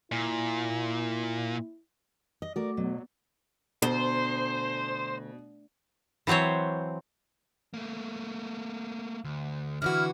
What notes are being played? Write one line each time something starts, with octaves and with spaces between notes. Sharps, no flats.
A#2 E4
D#5
A3 F#4 A#4 D5
B2 F#3
D2 B2 C5
E3 F#3 C4 C5 C#5
A3 A#3
D2
D3 E3 E4 F#4 F6